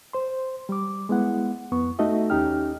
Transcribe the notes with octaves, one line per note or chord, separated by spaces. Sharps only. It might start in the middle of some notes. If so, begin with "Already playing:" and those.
C5 C6
G3 D6
G#3 B3 E4 F#5
F2 B3 C#6
A3 D#4 F#4 A4 D#5 E5
D#2 C#4 D#4 G4 G5 F6